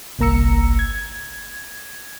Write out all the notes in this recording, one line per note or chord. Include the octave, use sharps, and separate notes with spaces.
G1 C2 A#3 A#5 E6 C#7
G#6